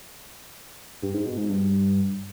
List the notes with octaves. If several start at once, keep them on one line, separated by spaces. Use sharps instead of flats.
G2
G#2
B2
G#2
G2